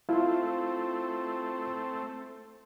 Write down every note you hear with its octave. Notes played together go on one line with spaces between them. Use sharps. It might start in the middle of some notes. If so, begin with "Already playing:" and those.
A3 C4 E4 F4